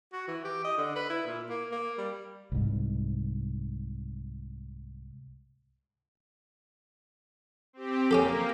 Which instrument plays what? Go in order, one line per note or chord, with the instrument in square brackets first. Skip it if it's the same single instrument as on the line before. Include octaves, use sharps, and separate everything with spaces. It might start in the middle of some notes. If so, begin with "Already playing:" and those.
[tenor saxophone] F#4
E3
G4
D#5
D3
B4
E4
A#2
A#3
A#3
G3
[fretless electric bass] C2 G#2
[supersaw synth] C4 G4
[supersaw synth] A#3 [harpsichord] C#4 G4 A4